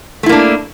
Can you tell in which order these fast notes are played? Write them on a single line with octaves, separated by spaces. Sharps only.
A3 E4 A#3 D4